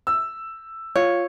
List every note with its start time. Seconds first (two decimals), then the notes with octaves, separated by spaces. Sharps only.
0.07 E6
0.96 F4 C#5